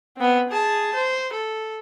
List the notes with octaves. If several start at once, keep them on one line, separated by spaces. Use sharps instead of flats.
B3 C4
G#4 A5
C5
A4